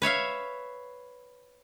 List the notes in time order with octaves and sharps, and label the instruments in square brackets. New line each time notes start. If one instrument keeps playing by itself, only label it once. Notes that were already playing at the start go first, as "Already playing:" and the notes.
[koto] B4 C#5 E5 F5